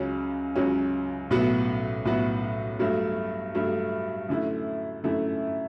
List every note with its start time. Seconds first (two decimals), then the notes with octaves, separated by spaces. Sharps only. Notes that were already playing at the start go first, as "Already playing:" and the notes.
Already playing: C#2 C#3 F#3 C#4
0.56 C#2 C#3 F#3 C#4
1.30 B1 A2 F#3 B3 F#4
2.05 B1 A2 F#3 B3 F#4
2.79 G2 F#3 A3
3.55 G2 F#3 A3
4.29 F#2 D3 A3 E4
5.04 F#2 D3 A3 E4